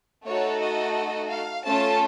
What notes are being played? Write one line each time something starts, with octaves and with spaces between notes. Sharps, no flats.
A3 D#4 F#4 A4 C#5
D#5
F5
A3 C#4 F4 A4 A5